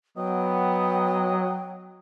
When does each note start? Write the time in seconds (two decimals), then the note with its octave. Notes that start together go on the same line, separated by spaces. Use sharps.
0.17 F#3 B3 D#5 G5